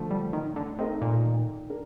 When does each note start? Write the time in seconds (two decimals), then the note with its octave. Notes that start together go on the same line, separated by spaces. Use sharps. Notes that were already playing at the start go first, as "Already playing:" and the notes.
Already playing: D3 F3 A3
0.11 G3
0.33 A2 D#3
0.56 D3
0.78 C3 A3 D#4 A#4 D#5
1.01 A#2
1.25 D#3
1.70 D4 A#4